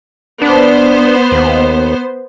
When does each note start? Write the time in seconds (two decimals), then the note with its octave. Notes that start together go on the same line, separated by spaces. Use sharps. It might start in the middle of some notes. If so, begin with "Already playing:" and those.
0.42 B3 D4 C5
1.32 D#2